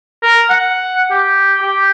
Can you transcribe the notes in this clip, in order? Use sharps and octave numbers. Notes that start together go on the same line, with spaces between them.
A#4
F#5
G4
G4